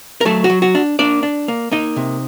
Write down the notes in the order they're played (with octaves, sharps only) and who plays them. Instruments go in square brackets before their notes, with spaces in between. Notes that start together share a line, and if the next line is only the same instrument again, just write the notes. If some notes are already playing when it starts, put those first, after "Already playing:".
[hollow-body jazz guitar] A#4
F#3 A3 A4
F#4
F#3
F#4
D4
A#3 D4 D5
D4
A#3
A#3 D#4 D#5
C3